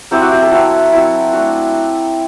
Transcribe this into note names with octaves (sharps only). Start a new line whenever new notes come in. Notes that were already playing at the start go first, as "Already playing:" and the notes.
F#3 C4 E4 G4
F#4
G4
A4
F#3 C4 E4 F#4
F#3 C4 E4
A3 D4 F#4